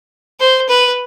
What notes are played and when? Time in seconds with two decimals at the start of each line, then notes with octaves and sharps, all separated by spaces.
0.40 C5
0.69 B4